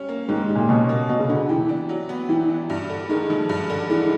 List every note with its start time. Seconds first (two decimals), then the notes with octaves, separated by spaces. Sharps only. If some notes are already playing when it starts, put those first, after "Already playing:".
Already playing: G3 C#4
0.09 A#3
0.28 G#2 D#3
0.49 G3
0.55 A#2
0.69 B2 C#4
0.89 A#3
1.09 B2 F#3
1.19 C#3
1.28 D3 B3
1.49 E3 G4
1.69 D4
1.89 F#3
2.09 B3
2.29 E3 G4
2.49 D4
2.70 G2
2.89 D3
3.09 D#3 G#3
3.30 F3
3.49 G2
3.70 D3
3.89 E3 G#3